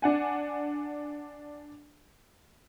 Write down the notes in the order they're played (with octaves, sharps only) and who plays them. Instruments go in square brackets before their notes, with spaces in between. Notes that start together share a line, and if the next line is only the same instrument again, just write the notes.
[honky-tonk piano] D4 F#5 G#5